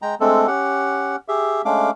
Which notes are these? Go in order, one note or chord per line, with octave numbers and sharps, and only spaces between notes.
G#3 G5 A#5
G#3 A3 C4 D4 A4
C#4 G4 F#5
G4 G#4 E5
G#3 A3 C#4 D4 F5 D6